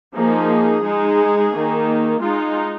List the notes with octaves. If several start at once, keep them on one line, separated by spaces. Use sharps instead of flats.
F3 A#3 D#4 G#4
G#3 D#4
D#3 A#3 D#4
G#3 D#4 F4